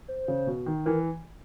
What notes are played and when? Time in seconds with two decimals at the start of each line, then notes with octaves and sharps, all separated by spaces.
0.08 C5
0.28 C#3
0.47 B2
0.66 D#3
0.86 E3 A#4